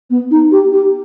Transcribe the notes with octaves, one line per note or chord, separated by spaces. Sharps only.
B3
D#4
G4
G4